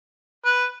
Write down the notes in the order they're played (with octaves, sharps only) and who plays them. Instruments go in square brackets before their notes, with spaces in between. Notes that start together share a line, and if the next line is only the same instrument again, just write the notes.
[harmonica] B4